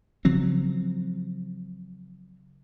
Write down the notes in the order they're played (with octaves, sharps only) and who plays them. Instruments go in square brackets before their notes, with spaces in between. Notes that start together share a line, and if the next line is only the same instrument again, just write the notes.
[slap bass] C#3 F3 F#3 C4